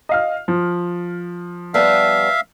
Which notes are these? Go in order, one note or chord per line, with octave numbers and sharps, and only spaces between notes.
D#5 F5 F6
F3
G3 B3 E5 F5 A5